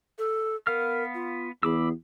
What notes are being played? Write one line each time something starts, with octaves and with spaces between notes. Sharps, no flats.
A4
B3 A#4 F5 F6
F4
E2 G#4 B5 D6 E6